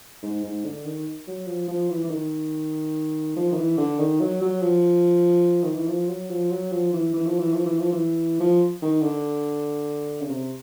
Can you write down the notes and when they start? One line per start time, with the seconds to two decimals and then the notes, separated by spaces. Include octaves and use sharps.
0.22 G#2
0.43 G#2
0.64 D3
0.85 D#3
1.27 F#3
1.47 F3
1.68 F3
1.90 E3
2.04 E3
2.10 D#3
3.36 F3
3.52 D#3
3.57 E3
3.78 D3
3.99 D#3
4.21 F#3
4.41 F#3
4.62 F3
5.63 D#3
5.75 E3
5.88 F3
6.08 F#3
6.30 F3
6.51 F#3
6.72 F3
6.93 E3
7.13 E3
7.26 F3
7.39 E3
7.53 F3
7.65 E3
7.79 F3
7.92 E3
8.40 F3
8.82 D#3
9.02 D3
10.21 C#3
10.29 C3